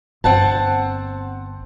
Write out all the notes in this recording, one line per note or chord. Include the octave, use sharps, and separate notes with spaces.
G1 C4 F#5 A5